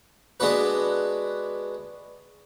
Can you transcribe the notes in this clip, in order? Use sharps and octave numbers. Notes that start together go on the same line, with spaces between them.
G#3 B3 D4 F#4 B4